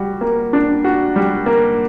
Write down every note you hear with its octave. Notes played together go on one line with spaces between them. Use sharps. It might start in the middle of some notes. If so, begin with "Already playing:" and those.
Already playing: G3 F#4
A#3
D4
F#4
G3
A#3